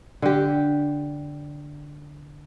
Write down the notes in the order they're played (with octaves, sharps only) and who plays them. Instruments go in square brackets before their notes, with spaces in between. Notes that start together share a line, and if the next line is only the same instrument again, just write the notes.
[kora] D3 G4